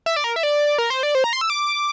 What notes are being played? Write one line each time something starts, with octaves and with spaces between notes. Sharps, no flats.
E5
D5
A#4
E5
D5
A#4
C5
D5
C5
A#5
C6
E6
D6